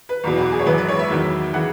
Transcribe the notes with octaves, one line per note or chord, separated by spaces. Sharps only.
B4
F#1 E2 B2
F#4
G#4
C#5
G#1 F#2 E3 G#3 B4
B4
C#5
E5
E2 D#3 F#3
C#3 E3 F#5